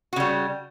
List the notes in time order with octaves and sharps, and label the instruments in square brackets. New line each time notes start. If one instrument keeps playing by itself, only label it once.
[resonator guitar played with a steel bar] F#4
C#3
G3